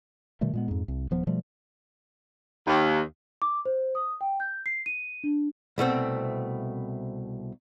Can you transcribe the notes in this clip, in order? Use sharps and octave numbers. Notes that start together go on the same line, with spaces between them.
B2 D#3 G3 A3
A#2 G#3 B3
F2 G#2
C2
D#1 F3 B3
B2 F3 G3 A3
D#2
D6
C5
D#6
G5
G6
C7
D#7
D4
C2 B2 A3 C4